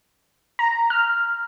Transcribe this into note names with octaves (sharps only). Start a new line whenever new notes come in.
A#5
F6